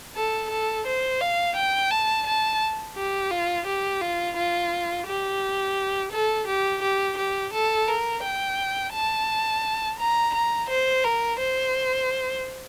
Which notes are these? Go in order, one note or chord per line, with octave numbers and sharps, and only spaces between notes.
A4
A4
C5
F5
G5
A5
A5
G4
F4
G4
F4
F4
G4
A4
G4
G4
G4
A4
A#4
G5
A5
A#5
A#5
C5
A#4
C5